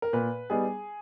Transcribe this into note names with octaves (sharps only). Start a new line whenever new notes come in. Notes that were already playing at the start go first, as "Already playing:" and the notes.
A#4
A#2 B4
G3 B3 D#4 G#4